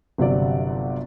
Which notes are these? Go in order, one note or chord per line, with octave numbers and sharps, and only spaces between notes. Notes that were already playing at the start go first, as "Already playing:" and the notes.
G1 C3 F#3 D5